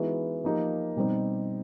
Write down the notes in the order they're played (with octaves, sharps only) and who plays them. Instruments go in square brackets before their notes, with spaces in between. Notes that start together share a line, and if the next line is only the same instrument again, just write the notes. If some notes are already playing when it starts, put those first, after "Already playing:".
Already playing: [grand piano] E3 G#3 B3 D#4 F#4
F3 A#3 D#4 G4
B2 G3 C4 D#4